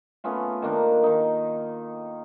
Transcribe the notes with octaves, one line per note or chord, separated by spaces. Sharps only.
A3 B3 C#4 F4
D#3 A#3 D4 A#5
D#3 D#4